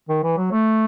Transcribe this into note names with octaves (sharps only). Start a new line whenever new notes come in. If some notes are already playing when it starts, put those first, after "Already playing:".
D#3
E3
F#3
A3